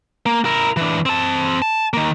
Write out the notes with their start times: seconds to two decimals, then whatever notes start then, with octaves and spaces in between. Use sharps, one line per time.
0.26 A#3
0.45 E4 A#4
0.77 E3 D4
1.06 C4 A5
1.62 A5
1.94 D#3 A#3